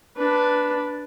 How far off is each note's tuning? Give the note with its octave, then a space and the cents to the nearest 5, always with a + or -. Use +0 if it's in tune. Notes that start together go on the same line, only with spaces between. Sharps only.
D4 -5 B4 +0